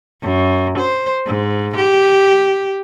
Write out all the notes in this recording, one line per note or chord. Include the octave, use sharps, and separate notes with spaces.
F#2
C5
G#2
G4